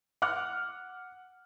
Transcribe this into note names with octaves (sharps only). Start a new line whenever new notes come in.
F#5 D6 F6 F#6